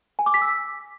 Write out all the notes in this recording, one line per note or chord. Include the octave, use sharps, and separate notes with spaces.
G#5
D6
B6
E6